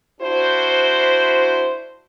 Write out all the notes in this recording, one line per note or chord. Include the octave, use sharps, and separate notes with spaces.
D4 E4 F#4 C5